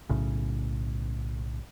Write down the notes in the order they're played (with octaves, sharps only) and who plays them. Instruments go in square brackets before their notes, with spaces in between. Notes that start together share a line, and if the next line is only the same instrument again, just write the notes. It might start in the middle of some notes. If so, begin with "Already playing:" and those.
[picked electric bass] B1 A2 C#3